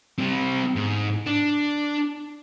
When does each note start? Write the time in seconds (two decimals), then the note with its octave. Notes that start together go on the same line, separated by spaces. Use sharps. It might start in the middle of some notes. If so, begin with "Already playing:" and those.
0.18 G3 C4
0.76 G#2
1.26 D4